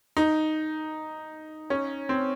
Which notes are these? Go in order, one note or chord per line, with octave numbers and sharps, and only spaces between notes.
D#4
C#4
C4